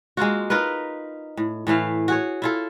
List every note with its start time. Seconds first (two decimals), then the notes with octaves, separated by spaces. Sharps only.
0.17 G#3 A#3 F4 F#4
0.50 D#4 F4 A#4 B4
1.37 A2
1.67 A2 E3 A3 F5
2.08 F#4 G#4 C#5
2.42 E4 F4 A4